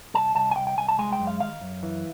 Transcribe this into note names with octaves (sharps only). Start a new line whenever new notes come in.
C2 A5
C2 A5
G#5
C2 G5
G5
C2 G#5
A5
G#3 G#5
G5
F#2
F5
D#3 F5
F#2
E3